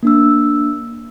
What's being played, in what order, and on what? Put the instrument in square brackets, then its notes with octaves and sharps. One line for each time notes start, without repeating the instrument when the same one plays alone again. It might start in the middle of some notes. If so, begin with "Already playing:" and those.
[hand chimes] A#3 D4 E6